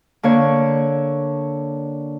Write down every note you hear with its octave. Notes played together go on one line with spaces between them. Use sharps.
D3 A#3 C#5